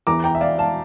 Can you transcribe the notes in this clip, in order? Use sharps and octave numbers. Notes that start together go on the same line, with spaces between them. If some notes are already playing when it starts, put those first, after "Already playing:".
E2 E3 A#5 D6
G5 A#5
E5
D5 F5
F5 A5